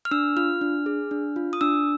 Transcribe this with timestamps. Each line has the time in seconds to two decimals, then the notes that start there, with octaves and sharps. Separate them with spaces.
0.05 F6
0.11 D4 E6
0.36 F4 F6
0.61 D4
0.86 G#4
1.11 D4
1.36 F4
1.53 D#6
1.61 D4 E6